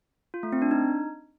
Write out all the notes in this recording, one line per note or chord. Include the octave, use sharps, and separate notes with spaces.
F4
A3
C4
D4
D#4